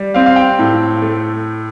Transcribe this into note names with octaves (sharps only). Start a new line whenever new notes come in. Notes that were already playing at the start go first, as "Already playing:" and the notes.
Already playing: G3
C4 F5
F5
G5
A2
A3